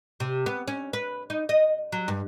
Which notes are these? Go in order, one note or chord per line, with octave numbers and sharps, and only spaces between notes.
C3
B3
C#4
B4
D#4
D#5
F#3
G2